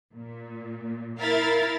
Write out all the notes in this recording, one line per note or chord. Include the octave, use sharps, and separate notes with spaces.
A#2
E4 A#4 F5 B5 A6